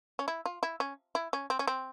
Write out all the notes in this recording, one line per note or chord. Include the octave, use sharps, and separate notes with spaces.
C#4
E4
F4
E4
C#4
E4
C#4
C4
C#4
C4